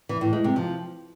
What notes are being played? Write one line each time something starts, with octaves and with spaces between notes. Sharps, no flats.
E3
A2
G#3
C3
F3